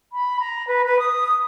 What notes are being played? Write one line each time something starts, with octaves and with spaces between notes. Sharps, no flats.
B5
A#5
B4
B4
D#6